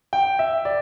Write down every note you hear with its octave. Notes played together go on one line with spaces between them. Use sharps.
G5
E5
D5